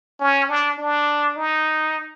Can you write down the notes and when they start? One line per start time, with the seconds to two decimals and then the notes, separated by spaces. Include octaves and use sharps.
0.20 C#4
0.49 D4
0.78 D4
1.36 D#4